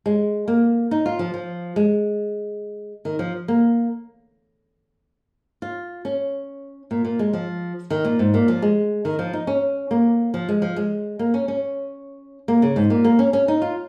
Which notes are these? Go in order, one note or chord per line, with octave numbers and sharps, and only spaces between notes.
G#3
A#3
D#4
F4
F3
F3
G#3
D#3
F3
A#3
F4
C#4
A#2
A#2
G#3
F3
D#3
A#2
G#2
A#2
F3
G#3
D#3
F3
D#4
C#4
A#3
F3
G#3
F3
G#3
A#3
C#4
C#4
A#3
C#3
G#2
A#2
A#3
C#4
C#4
D#4
F4